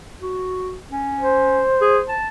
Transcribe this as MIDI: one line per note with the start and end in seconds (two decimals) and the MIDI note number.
0.22 0.78 66
0.92 1.63 61
1.21 2.18 72
1.81 1.99 68
2.09 2.28 81